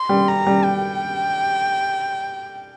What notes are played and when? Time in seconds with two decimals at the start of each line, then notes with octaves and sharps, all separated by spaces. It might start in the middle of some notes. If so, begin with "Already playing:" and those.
Already playing: C6
0.09 G3
0.28 A#5
0.46 G3
0.64 G5